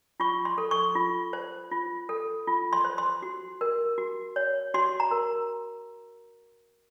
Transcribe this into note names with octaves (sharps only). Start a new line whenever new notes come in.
F4 C#6
C6
A4
C#6
F4
C5
F4
A4
F4
C6
C5
C6
F#4
A#4
F#4
C#5
F#4 C6
A#5
A#4